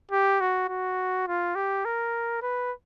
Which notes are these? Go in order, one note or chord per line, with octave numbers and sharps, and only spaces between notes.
G4
F#4
F#4
F4
G4
A#4
B4